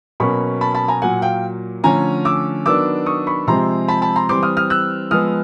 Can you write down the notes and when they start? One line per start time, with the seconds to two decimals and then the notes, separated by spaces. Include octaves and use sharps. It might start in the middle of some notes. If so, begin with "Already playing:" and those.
0.20 B2 F#3 A#3 C#4 B5 C#6
0.61 A5 B5
0.74 A5 B5
0.88 G#5 A#5
1.02 A#2 F#3 A#3 F#5 G#5
1.22 F5 G5
1.84 D3 F3 A3 C#4 G#5 A#5
2.25 D6 E6
2.65 D#3 F#3 B3 D4 D6 E6
3.06 C#6 D#6
3.27 B5 C#6
3.47 C3 F3 G#3 C4 A#5 C6
3.88 A5 B5
4.02 A5 B5
4.16 A#5 C6
4.29 E3 G3 C4 C6 D6
4.43 D#6 F6
4.57 D#6 F6
4.70 E6 F#6
5.11 F3 G#3 B3 D#6 F6